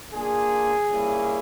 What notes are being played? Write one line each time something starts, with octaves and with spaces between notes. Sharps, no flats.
A#3 D4 F4 G#4
G3 A#3 C#4 E4